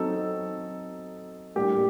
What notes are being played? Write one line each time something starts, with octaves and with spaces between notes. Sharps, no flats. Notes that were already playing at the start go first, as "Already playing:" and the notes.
Already playing: F#3 C4 D#4 A4
A2 G3 A#3 D4 G4